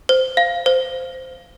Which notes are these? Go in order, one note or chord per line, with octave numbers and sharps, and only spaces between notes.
C5
F5
C5